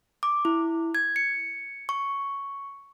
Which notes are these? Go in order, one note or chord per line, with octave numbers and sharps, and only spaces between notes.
D6
E4
G#6
C#7
C#6